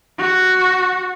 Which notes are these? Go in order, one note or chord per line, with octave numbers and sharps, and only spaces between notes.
F#4